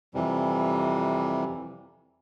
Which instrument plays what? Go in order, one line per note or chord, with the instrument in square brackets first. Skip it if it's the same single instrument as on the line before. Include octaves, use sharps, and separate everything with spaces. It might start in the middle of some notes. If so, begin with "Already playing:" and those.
[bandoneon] F2 C3 E3 G3